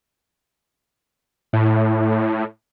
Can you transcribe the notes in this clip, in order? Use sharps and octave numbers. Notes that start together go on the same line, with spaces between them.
A2